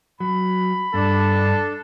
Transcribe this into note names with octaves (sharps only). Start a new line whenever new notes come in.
F#3 B5
G2 D4 A4